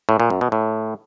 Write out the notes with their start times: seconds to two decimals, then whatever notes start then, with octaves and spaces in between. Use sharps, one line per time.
0.09 A2
0.20 A#2
0.30 F#2
0.41 B2
0.52 A2